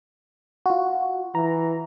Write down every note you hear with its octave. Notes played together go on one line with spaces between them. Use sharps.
F4 F#4
E3 A#5